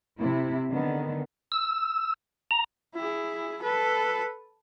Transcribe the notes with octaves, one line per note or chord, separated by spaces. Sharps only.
C3 E4
D3 D#3 B3
E6
A#5
E4 G#4
A4 B4